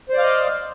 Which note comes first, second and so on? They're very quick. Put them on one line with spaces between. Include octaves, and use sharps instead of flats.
C5 D5 F5 D#5